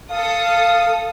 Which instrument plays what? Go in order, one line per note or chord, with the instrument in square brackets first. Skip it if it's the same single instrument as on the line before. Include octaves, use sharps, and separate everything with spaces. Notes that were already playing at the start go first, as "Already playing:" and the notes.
[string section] A4 D#6 [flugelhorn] F5